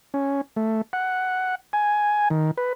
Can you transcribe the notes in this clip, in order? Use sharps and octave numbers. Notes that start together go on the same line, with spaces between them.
C#4
A3
F#5
G#5
D#3
B4